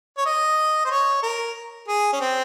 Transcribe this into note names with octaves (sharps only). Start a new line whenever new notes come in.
C#5
D#5
C5
C#5
A#4
G#4
C#4
C4